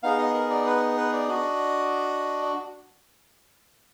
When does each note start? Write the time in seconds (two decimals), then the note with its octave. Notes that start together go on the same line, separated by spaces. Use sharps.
0.03 B3 D#4 G#4 F5
0.19 D#5
0.34 A#4
0.50 D5
0.66 B4
0.97 B4
1.13 D5
1.28 D4 F#4 D#5